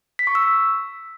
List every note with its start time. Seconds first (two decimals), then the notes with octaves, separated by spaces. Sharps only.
0.19 B6
0.27 C#6
0.35 E6
0.43 B6